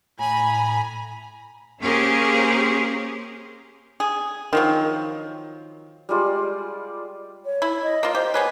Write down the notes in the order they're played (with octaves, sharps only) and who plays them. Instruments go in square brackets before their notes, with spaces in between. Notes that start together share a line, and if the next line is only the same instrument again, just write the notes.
[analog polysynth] A2 A#5 [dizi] G#5 [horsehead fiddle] B5
[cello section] A#3 C#4 G4 G#4 A#4 C5
[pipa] G#4
D#3 F3 F#3
[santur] G3 G#3 F4 D5
[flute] C#5
[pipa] E4
[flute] D#5
[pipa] A#3 F4
[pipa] G4 [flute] C5
[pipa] B3 G#4 B4 [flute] C#5